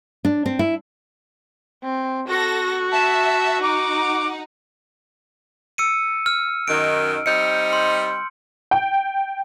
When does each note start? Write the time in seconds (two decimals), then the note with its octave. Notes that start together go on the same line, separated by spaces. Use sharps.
0.25 D4
0.46 C4
0.59 E4
1.83 C4
2.28 F#4 A4 A#6
2.91 E5 A5
3.61 D#4 F#5 D6
5.78 E6 C#7 D#7
6.26 F6
6.68 F#2 D#3 D7
7.26 G3 C4 D#4 G6 C#7
7.73 C6
8.71 G5